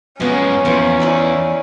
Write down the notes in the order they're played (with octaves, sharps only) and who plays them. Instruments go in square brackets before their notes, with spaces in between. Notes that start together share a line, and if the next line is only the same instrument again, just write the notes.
[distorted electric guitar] F#2 G#3 [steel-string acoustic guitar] F3 B3 [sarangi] C#4
[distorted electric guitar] E2 [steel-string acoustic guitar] A#2 F3 B4
[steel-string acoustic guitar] D#4 E4 D5